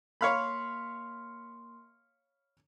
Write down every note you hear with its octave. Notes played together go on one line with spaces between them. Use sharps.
A#3 C#5 F5 B5 C6